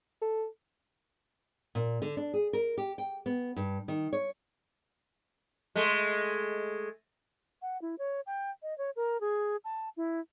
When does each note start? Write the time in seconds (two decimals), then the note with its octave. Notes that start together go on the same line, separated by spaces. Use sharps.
0.22 A4
1.75 A#2
2.02 D3
2.17 D4
2.34 G#4
2.53 A#4
2.78 G4
2.98 G5
3.26 B3
3.56 G2
3.88 D#3
4.13 C#5
5.75 G#3 A3
7.62 F#5
7.82 E4
7.99 C#5
8.26 G5
8.63 D#5
8.78 C#5
8.96 A#4
9.21 G#4
9.64 A5
9.97 E4